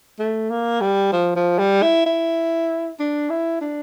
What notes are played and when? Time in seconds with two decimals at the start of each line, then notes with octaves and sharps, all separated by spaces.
0.19 A3
0.50 A#3
0.81 G3
1.12 F3
1.36 F3
1.59 G3
1.82 E4
2.06 E4
2.99 D4
3.30 E4
3.61 D4